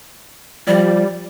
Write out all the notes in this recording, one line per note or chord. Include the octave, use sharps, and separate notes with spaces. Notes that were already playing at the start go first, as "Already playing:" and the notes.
F3 G3 D5